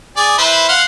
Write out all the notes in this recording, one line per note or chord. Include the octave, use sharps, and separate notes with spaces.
G#4 D5
E4 B4 C5
F5 F#5 C6